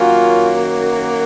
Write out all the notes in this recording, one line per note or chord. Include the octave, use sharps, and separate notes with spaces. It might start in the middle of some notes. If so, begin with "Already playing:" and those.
Already playing: F#2 D#3 F#3 A#3 C#4 F4